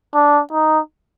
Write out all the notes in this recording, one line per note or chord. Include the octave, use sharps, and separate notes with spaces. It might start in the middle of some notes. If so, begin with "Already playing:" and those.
D4
D#4